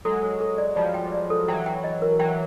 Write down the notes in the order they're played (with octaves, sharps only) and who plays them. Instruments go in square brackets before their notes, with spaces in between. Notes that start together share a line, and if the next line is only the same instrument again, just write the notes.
[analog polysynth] F#3 G#3 [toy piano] A4
[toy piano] A4
A4
D5
[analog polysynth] F3 G3 [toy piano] D5
[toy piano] G5
D5
A4
[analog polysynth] E3 F#3 [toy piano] G5
[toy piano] G5
D#5
A#4
[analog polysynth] E3 F#3 [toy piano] G5